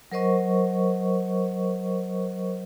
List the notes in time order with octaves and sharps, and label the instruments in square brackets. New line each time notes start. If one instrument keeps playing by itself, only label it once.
[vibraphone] F#3 A#4 C5 D#5 C#6